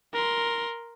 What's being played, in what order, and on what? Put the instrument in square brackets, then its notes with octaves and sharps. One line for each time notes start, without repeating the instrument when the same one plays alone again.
[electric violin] A#4 C6